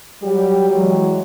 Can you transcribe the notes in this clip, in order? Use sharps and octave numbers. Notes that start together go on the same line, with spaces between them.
F#3 G3 G4
E3 F#3 G#3